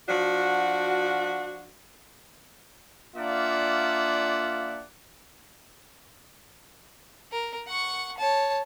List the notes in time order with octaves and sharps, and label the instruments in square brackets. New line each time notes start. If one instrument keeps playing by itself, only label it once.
[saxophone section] F3 D4 F#4
[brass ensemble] A#3 D4 F4 D5 E5 F#5
[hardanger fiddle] A#4
F#5 C#6
C#5 A5